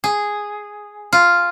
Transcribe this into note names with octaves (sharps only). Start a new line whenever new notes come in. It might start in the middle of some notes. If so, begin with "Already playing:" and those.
G#4
F4